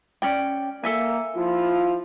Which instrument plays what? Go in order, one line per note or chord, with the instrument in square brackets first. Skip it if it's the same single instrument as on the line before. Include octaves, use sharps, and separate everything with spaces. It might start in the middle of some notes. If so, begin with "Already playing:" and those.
[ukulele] C#4 D5 G5
[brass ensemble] A#3 [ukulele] A4 E5 G#5
[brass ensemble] F3 E4 F4